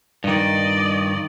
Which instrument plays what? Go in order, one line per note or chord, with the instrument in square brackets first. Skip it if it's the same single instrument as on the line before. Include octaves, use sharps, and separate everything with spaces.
[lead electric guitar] G2 D#3 [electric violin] D5 D#5